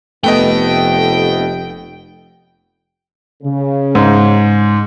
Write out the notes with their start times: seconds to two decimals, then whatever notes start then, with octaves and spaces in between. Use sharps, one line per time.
0.24 F1 A3 B3 D#5 G5
3.43 C#3
3.95 G#2